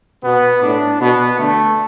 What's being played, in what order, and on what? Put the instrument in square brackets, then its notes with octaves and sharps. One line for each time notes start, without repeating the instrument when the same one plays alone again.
[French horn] B2 [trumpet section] B3
[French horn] A2 [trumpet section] D4
[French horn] B2 [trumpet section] B3
[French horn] D3 [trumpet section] A3